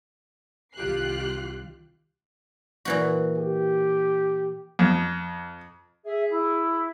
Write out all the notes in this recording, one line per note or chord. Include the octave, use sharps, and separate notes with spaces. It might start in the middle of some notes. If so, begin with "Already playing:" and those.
C2 D#3 F4 G4 F#6 C7
A#2 E3 F#4
G4
F2
G#4 E5
E4